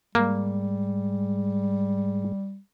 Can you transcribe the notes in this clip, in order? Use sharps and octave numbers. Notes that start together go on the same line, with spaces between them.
G#2 G3 G#3 A#3